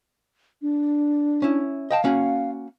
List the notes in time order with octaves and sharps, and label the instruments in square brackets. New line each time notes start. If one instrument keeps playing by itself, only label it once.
[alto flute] D4
[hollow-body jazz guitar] C#4 E4
[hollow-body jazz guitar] D#5 G5 A5 [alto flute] F5
[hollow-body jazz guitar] A#3 C#4 F#4